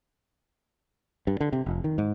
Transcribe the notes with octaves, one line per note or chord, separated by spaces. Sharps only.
G2
D3
C3
F1
D#3
G#2